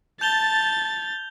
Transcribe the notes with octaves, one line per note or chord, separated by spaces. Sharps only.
A5 G6 A6 F7 G7